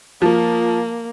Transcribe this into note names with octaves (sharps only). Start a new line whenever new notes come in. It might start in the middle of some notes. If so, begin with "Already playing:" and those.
F3 A#3